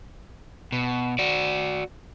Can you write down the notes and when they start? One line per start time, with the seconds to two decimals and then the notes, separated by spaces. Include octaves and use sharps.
0.72 B2
1.19 F#4 D5